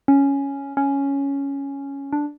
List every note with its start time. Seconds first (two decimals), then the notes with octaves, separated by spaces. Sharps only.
0.08 C#4
0.77 C#4
2.13 D4